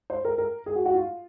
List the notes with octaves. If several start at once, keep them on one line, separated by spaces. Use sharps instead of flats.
C5
A#4
A#4
G#4
F#4
F#4
F4